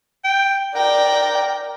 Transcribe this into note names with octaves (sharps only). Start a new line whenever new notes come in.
G5
A#4 D5 G5